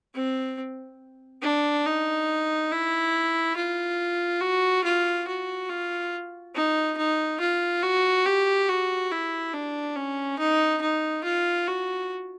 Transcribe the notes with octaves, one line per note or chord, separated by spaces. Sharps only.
C4
D4
D#4
E4
F4
F#4
F4
F#4
F4
D#4
D#4
F4
F#4
G4
F#4
E4
D4
C#4
D#4
D#4
F4
F#4